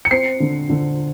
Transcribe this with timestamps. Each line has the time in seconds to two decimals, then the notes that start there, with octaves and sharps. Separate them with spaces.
0.05 C#7
0.11 C4 C7
0.40 D3
0.70 D3